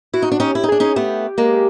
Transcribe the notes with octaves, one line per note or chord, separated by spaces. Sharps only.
E4 F#4
D#4
D4
C#4 D#4 G4
E4
D#4
D4 G#4
C#4 D#4
A3 B3 G4
G#3 A#3